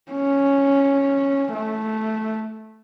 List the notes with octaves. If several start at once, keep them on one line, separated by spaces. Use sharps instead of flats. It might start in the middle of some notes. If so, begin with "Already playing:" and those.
C#4
A3